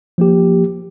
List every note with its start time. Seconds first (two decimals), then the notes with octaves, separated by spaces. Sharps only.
0.18 F3 A#3 G4